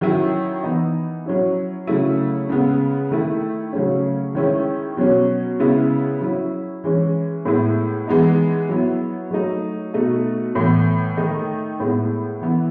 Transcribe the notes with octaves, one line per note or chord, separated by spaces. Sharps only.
D#3 F#3 C#4 E4
E3 B3 D#4
F#3 C#4 E4
C#3 F#3 A3 E4
C#3 G#3 B3
D#3 A3 E4
C#3 F#3 A3 C#4
D#3 G#3 C#4 E4
B2 F#3 C#4
C#3 G#3 B3 E4
F#3 C#4 E4
E3 G#3 C#4
A2 G#3 B3 E4
E3 G#3 B3 D#4
F#3 B3 E4
F#3 A3 D#4
B2 A3 D#4
A2 E3 B3
D#3 A3 D#4
A2 G#3 B3 E4
E3 B3 E4